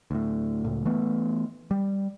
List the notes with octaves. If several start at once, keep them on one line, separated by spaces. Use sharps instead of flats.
D2 A2
C#2 A2
E3 A3 B3
G3